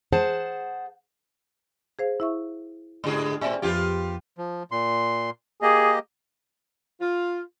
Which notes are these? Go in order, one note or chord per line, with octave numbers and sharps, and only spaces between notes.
G#4 C5 F#5 A5
G#4 C5 F5
E4 E5 C#6
G#2 D3 G#4
A2 C4 D5 E5 G#5
F2 F3 B3 F4 G4
F3
A#2 C6
A#3 G4 G#4 D#5
F4